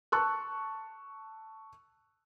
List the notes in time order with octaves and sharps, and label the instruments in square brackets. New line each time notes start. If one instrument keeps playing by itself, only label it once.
[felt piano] A5 C#6 E6 F#6